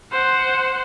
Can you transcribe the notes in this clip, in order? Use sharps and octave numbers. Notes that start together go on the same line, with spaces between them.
C5 F#5